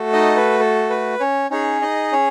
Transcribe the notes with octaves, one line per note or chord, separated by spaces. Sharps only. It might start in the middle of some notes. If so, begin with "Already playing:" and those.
Already playing: A3 F#4 A4
D#4 D#5
B4
A4
B4
C#4 C#5
C#4 D#4 G#4 C#5
D#4 D#5
C#4 C#5